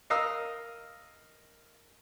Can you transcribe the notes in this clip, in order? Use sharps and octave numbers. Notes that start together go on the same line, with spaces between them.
A#4 D#5 F5 D#6 E6